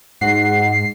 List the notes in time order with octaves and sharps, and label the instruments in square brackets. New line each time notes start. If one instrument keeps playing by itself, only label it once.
[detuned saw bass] G#2 [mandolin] F#4 F#5 [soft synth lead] C7